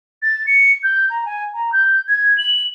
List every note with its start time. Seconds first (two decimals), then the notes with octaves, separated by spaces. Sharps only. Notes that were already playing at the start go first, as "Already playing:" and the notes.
0.23 A6
0.47 C#7
0.83 G6
1.10 A#5
1.25 G#5
1.54 A#5
1.72 G6
2.08 G#6
2.38 F#7